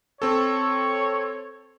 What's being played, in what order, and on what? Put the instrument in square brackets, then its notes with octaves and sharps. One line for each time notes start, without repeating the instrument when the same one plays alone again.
[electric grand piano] C4 A4 [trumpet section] C#5